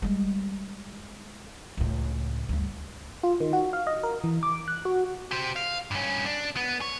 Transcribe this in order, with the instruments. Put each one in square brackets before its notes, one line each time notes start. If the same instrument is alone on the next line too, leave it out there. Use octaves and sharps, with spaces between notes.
[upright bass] G3 G#3
C#2 A2
D2 G2
[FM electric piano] F4
D#3
F#4
F5
D#5
A#4
E3
D6
F#6
F#4
[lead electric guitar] G4 C5
F5
G2 C#4
D4
B3
C#5